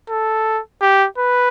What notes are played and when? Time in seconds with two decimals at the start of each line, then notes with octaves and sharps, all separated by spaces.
0.10 A4
0.82 G4
1.18 B4